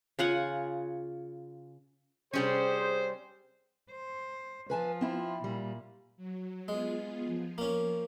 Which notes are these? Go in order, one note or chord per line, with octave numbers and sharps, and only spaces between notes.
C#3 F4 F#5 G#5
C3 G3 C#4 G#4 C5
C5
F3 B4 G#5 A5
C4 E4 F4
A#2 G3
F#3
G#3 B3 F4 G#4
F3
A#3 C#4